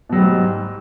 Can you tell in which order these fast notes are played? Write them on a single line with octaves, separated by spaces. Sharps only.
B2 F#3 G3 G#2